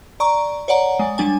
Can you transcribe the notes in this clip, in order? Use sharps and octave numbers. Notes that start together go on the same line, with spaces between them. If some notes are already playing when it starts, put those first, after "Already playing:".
D5 A#5 C#6
C#5 D5 F#5 A#5
G#3
G3 D4 G#5